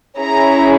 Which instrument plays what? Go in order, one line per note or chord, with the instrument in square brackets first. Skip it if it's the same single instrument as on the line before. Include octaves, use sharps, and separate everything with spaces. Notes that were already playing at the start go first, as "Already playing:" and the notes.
[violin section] C#4 E4 G#4 A#5